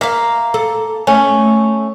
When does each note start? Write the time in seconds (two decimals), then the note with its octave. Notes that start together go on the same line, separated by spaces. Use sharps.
0.01 A#3 E5 F5
0.54 A4
1.07 A3 C#4